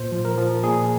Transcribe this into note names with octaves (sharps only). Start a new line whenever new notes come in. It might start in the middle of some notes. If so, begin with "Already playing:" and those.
Already playing: A#2 C5
F3
A#4
F3
A#2 G#4